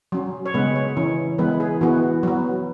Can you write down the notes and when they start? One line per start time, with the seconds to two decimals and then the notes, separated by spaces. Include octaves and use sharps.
0.12 F#3 C#4
0.46 C#5
0.54 C#3 G#3 B3 B4
0.76 C#5
0.97 E3 C#4
1.38 E3 G#3 B3 B4
1.60 G#4
1.81 E3 B3 F#4
2.23 F#3 B3